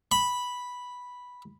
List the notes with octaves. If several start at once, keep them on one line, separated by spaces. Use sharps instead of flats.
B5